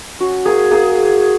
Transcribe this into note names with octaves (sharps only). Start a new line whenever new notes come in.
C#4 F#4
A#3 G#4
A#3 G#4